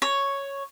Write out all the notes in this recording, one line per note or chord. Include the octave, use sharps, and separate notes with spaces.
C#5